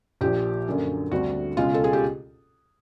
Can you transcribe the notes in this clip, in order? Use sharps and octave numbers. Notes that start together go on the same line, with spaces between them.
A#1 A#2 F3 G4
F#2 D3 F#3 A#3 C#4
D2 D3 G3 C4 F#4
C#2 B2 G#3 C#4 F4
A4
G#4
G4